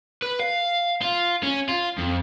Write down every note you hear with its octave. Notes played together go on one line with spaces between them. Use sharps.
B4
F5
F4
C#4
F4
F2